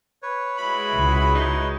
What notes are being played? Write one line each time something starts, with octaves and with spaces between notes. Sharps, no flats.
B4 C#5
G#3 E4 F#4 B5
C#2
D#4